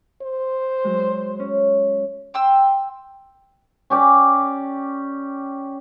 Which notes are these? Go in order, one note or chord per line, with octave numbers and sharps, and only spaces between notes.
C5
F#3 G#3
C#4
G5 C6 E6
C#4 G4 D5